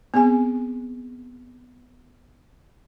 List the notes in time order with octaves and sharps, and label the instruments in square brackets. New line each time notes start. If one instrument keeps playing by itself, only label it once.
[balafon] B3 C4 G#4 G#5